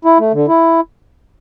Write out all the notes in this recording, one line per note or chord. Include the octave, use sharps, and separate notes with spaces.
E4
A3
D3
E4